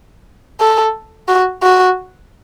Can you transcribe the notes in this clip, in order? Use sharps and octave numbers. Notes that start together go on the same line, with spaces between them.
A4
F#4
F#4